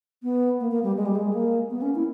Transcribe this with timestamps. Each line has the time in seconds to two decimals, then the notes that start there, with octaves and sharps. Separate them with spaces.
0.23 B3
0.60 A#3
0.71 A#3
0.83 G3
0.97 G#3
1.06 G3
1.15 G#3
1.33 A#3
1.70 B3
1.82 C#4
1.95 E4